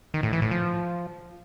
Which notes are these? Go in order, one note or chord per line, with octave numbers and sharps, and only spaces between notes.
D#3
A2
E3
A2
F3